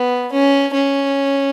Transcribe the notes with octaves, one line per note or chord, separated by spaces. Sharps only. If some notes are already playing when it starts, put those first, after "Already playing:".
Already playing: B3
C#4
C#4